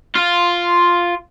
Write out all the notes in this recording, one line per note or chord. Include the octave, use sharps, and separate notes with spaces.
F4